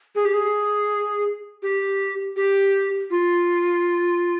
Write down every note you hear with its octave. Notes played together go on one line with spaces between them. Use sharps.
G#4
G4
G#4
G4
G4
F4